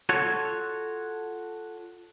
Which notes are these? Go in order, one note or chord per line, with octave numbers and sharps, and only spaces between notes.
F4 F#4 A4 C#5